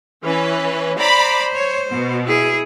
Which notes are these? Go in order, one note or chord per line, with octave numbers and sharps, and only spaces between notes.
E3 C#4 B4
C5 D5 A#5 B5
C#5
B2
E4 G#4